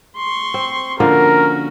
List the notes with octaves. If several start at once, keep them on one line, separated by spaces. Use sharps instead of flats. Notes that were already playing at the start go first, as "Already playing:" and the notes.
C6 C#6
C4
D3 F3 A#3 C#4 F#4 A#4